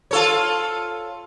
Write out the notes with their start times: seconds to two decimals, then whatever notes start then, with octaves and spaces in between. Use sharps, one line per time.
0.11 F4 A4 C#5